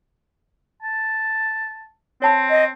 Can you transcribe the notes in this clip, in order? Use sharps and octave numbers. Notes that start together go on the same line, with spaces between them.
A5
C4 C#5 A5 B5
D#5